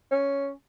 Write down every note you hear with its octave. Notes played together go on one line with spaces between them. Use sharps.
C#4